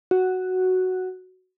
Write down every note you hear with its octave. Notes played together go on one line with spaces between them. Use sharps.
F#4